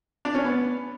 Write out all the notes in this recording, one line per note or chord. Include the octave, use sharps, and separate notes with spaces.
D4
C#4
B3